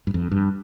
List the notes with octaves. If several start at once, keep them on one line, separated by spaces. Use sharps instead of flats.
G2
F2
G2